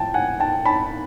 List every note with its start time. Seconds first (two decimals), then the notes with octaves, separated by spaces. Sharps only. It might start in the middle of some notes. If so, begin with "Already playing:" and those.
Already playing: A2 F3 G5 A5
0.14 F#5 G#5
0.40 G5 A5
0.65 A5 B5